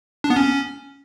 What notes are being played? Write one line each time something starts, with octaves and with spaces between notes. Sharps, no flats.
D4
B3
C#4